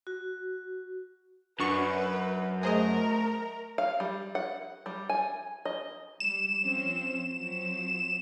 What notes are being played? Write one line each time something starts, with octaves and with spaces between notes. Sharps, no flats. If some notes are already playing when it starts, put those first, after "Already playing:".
F#4
F#2 D4 B4 C#6
A3 G#4 A#4 C5 D#5
F5
G3
F#5
G3
G#5
D#5
G3 E7
F3 C4 C#4
F3 F#3 C4